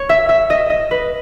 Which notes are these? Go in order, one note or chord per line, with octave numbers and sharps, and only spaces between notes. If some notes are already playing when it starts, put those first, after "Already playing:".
Already playing: C#5
E5
E5
D#5
D#5
B4